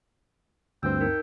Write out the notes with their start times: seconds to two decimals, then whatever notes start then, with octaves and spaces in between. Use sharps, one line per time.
0.83 D2 G2 C4 G5 E6 G6
1.01 D#4 A#4